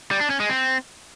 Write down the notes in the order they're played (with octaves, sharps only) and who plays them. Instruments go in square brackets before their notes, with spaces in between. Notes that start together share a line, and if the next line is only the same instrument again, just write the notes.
[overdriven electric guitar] G3
D4
C#4
G#3
C4